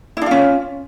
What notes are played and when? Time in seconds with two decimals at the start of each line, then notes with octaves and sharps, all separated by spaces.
0.17 E4
0.22 D4
0.26 F4
0.31 C#4